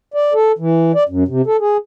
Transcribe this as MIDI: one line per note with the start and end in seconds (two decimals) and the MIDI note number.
0.14 0.33 74
0.34 0.52 69
0.59 0.92 52
0.95 1.04 74
1.09 1.24 42
1.28 1.42 48
1.47 1.57 69
1.60 1.77 68